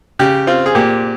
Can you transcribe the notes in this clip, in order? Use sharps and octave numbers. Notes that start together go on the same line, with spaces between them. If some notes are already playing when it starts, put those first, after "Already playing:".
C#3 G4
C4 F4
G#4
A#2 G4